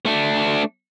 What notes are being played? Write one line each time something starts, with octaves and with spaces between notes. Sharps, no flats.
A3 D4